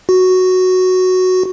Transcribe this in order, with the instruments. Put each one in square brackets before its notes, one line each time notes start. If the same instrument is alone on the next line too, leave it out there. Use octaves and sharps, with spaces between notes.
[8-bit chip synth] F#4